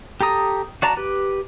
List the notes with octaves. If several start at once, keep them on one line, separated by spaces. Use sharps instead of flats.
G4 A4 A#5 D#6
F#4 D5 A5 A#5
G4 B4